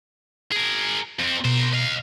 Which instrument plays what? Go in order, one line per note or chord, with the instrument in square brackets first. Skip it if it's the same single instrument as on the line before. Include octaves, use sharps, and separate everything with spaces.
[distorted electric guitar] G#4 A#4
F2 C4
[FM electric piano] B2 [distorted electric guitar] A#4 C5
[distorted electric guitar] D#5 F5